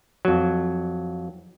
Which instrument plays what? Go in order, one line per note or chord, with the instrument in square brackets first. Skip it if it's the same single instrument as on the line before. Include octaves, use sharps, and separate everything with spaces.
[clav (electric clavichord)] F2 F#3